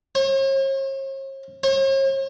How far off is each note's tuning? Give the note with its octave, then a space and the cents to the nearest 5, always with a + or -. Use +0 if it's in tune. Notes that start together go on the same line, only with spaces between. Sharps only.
C#5 -45
C#5 -45